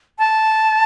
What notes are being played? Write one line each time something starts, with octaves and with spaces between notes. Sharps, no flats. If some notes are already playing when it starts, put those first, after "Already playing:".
A5